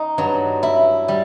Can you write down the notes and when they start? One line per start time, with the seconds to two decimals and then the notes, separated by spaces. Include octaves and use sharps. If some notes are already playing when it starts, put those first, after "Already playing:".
Already playing: D#4
0.18 G2 F#3
0.63 E4
1.08 G3